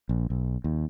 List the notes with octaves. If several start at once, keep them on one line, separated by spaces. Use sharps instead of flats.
A#1
B1
D#2